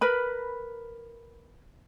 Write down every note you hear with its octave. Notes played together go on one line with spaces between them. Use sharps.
A#4 B4 B5